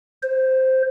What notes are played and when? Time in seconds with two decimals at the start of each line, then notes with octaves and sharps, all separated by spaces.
0.23 C5